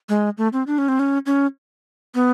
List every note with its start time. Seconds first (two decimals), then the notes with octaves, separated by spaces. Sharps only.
0.09 G#3
0.38 A3
0.53 C4
0.67 D4
0.78 C#4
0.88 C4
0.99 C#4
1.26 C#4
2.15 B3